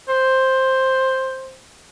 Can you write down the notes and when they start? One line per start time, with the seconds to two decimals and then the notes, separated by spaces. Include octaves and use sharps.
0.08 C5